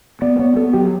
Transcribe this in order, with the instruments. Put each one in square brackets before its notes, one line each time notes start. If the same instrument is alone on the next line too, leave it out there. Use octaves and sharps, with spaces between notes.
[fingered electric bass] B3 [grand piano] D5
[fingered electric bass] B3 [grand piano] C#5
[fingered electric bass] B3 [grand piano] A4
[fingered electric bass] F#3 [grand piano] G4